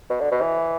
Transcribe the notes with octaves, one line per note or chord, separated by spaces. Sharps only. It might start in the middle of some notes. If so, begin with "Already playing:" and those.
B2
D3
B2
E3